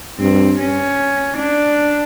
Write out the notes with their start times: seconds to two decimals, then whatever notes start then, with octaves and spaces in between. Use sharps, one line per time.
0.19 G2 C4
0.59 C#4
1.38 D4